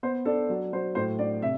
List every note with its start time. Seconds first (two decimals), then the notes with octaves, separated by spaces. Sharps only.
0.03 B3 C5
0.25 D4 A4
0.50 F#3
0.73 F#3 C5
0.95 A2 C5
1.19 D4 D5
1.42 C3 E5